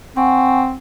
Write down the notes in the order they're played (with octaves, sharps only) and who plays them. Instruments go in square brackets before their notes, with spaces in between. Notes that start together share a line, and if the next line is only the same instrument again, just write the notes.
[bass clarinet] C4 [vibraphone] F#5 G#5 C#6